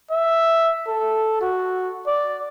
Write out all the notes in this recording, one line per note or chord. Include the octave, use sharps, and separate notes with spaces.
E5
A4
F#4
D5